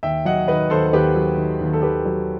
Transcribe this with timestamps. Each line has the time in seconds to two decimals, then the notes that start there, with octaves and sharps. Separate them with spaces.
0.03 D#2 E5 G5
0.25 F#3 D#5 F#5
0.48 D#3 B4 D#5
0.70 D#2 A4 C5
0.87 A4
0.93 D#2 G4 B4
1.15 F#3
1.37 D#3
1.61 D#2
1.73 A4
1.82 D#2 G4 B4
2.05 F#3